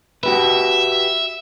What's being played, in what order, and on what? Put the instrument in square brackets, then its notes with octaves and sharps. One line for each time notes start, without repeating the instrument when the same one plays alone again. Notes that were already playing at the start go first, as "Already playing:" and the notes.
[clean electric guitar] F#4 G4 B4 [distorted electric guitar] E5